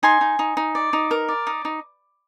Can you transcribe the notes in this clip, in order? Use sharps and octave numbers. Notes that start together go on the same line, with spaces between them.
D#4 G#5 C6
D#4
D#4
D#4
D5
D#4
A#4
D5
D#4
D#4